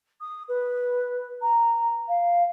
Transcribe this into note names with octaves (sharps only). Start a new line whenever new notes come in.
D#6
B4
A#5
F5